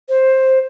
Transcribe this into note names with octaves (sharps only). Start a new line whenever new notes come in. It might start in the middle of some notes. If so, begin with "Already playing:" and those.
C5